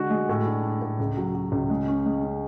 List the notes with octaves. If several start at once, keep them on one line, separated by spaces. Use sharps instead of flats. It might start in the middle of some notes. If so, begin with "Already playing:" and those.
Already playing: D3 G#3 F#4
G#3
A2
D4
D4
A2
C#2
F#3
F#3
C#2
G#3
C#4
G#3
C#4